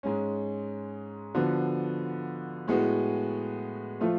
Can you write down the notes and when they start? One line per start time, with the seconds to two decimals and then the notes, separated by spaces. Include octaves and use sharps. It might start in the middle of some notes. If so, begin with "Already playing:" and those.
0.03 G#2 G#3 C#4
1.35 D3 F3 B3 F#4
2.68 A2 G#3 B3 F#4
4.00 F3 A3 F4